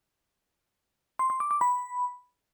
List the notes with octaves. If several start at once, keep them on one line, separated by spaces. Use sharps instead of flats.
C6
C6
D6
D6
B5